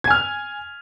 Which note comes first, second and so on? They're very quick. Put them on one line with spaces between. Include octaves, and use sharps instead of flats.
G#6 G#5 F6